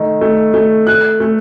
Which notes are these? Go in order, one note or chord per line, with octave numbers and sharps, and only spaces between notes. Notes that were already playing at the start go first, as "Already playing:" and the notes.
Already playing: D#3 A3
A3
A3
A3 F#6
A3